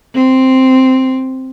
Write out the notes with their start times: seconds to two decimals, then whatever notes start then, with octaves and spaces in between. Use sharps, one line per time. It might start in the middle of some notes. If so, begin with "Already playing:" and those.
0.15 C4